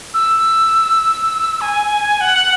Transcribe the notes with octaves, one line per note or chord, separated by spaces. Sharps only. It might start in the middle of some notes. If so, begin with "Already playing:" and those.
E6
G#5
F#5